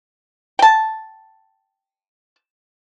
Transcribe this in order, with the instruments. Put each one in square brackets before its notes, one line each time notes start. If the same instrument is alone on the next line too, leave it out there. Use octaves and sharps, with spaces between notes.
[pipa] G5 A5